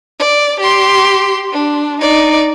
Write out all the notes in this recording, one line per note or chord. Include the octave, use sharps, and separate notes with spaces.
D5
G4 C6
D4
D#4 D5